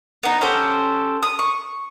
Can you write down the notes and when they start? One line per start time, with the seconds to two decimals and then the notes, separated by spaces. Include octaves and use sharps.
0.23 B3 D#4
0.41 C#4 G4 A4 C5
1.23 D#6
1.39 C#6